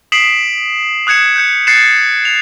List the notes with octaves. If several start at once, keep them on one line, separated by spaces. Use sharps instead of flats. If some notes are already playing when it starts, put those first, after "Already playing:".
D#6 B6 C7 D7 E7 F#7
D#6 F#6 G#6 C#7 E7
F#6 G6 C#7
F#6 A6 C7 C#7 E7
F7